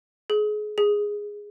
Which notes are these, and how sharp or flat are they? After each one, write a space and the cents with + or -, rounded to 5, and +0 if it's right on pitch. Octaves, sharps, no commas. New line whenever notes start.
G#4 +30
G#4 -5